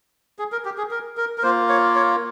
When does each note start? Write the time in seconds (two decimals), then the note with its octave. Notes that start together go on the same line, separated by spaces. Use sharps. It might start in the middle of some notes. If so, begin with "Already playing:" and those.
0.39 G#4
0.52 A#4
0.65 G4
0.78 G#4
0.91 A#4
1.17 A#4
1.38 A#4
1.43 A#3 F4 C5
1.69 C#5
1.95 C#5